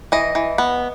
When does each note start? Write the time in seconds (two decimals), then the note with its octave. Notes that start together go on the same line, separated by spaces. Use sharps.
0.12 E3 D#5
0.35 E3
0.58 B3